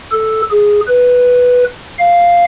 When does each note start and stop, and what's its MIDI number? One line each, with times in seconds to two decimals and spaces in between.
0.12 0.42 69
0.51 0.81 68
0.88 1.64 71
1.99 2.44 77